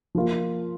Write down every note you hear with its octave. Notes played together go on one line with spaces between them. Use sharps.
F3 A#3 F4